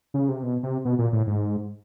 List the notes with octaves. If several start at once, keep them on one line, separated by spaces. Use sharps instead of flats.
C#3
C3
B2
C3
B2
A#2
A2
G#2